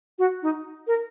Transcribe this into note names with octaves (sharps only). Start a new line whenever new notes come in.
F#4
D#4
A#4